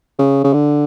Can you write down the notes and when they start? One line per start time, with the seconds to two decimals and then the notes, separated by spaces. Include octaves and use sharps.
0.19 C#3
0.44 C#3
0.53 D3